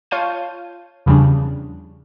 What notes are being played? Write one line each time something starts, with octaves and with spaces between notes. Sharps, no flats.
F4 C#5 F5 A5 G6 D#7
E2 C#3 F3 G3 D4